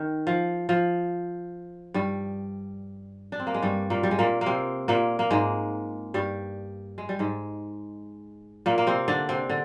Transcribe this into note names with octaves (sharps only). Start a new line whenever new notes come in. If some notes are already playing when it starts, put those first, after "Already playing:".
Already playing: D#3
F3
F3
G2 G3
D4
C4
A#3
G#3
G2 G3
A#2 A#3
G3
G#3
A#2 A#3
A#3
C3 C4
A#2 A#3
A#3
G#2 G#3
G2 G3
G#3
G3
G#2 G#3
A#2 A#3
A#3
C3 C4
D3 D4
C3 C4
D3